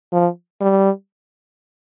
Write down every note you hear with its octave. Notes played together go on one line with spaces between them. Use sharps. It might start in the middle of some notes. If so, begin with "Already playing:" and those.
F3
G3